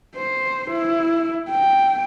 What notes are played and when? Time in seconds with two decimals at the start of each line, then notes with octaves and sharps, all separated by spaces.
0.16 C5
0.71 E4
1.50 G5